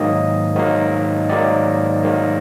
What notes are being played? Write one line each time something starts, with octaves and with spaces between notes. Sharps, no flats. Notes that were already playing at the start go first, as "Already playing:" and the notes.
Already playing: G#2 D#3 F#3 A#3 D#5
G#2 D#3 F#3 A#3
G#2 D#3 F#3 A#3 D5
G#2 D#3 F#3 A#3